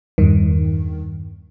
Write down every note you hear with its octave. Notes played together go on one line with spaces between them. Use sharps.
E2 G2 D#3